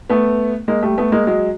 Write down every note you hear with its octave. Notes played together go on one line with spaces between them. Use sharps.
A3 B3
G#3 A#3
G3 A3
A3 B3
G#3 A#3
F#3 G#3